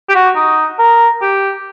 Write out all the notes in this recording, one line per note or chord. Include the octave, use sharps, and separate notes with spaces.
G4
F#4
D#4
A#4
G4